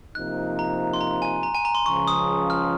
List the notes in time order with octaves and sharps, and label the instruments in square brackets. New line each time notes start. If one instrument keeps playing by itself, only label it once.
[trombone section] C3 F3 A#3 D#4 [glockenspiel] F#6
[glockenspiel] A#5
C6
A#5
G#5
A#5
G#5
A#5
C6
[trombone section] C#2 C#3 F3 [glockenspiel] C#6
[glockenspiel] D#6
F6